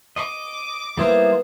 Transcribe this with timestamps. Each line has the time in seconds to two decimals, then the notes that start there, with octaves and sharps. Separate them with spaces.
0.16 D#5 D6
0.97 G3 A#3 B3 D#4 E4 C5